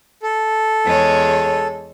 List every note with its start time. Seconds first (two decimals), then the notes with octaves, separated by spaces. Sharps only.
0.23 A4
0.85 E2 G#3 C#5